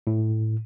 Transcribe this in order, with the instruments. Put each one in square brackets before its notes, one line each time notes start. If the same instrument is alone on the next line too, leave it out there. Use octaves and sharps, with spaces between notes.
[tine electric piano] A2